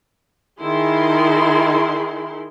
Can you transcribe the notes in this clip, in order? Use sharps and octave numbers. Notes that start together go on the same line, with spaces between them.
D#3 E4 G#4 C6